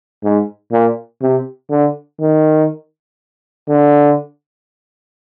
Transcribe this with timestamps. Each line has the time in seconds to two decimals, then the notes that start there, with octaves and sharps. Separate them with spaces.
0.24 G#2
0.72 A#2
1.22 C3
1.70 D3
2.21 D#3
3.68 D3